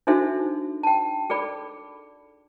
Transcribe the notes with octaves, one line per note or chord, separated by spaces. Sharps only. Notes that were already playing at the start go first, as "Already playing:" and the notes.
D4 D#4 F#4 A4 C5 E5
G5 A5
G#4 A4 D5 B5